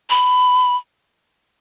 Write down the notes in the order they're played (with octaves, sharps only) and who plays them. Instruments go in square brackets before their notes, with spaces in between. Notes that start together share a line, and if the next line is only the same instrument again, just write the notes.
[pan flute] B5